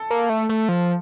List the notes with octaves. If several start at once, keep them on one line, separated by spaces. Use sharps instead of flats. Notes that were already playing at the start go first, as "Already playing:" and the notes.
Already playing: A4
A#3
A3
A3
F3